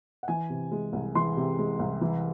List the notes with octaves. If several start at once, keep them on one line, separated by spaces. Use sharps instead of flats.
F#5
E3 G#5
C3
G#3
C2
E3 C6
C3
G#3
C2
E3